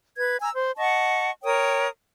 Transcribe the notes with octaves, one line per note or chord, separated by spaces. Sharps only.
B4 G#6
G#5 A#5 E6
C5
D#5 F#5 A5 C#6
A#4 C#5 G5 D#6